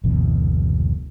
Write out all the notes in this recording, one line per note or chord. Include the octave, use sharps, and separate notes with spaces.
F#1 D2 B2 E3